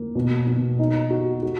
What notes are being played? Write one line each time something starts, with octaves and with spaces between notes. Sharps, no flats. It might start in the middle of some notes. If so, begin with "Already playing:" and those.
Already playing: A#3
B2
B2
D#4
F#4
F#4